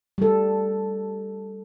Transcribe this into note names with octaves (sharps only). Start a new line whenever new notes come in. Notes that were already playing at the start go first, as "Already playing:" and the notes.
G3 A4